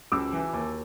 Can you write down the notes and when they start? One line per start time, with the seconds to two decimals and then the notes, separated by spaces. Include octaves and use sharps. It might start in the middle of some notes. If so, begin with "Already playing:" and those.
0.12 C#2 D6 E6
0.33 E3
0.53 D#2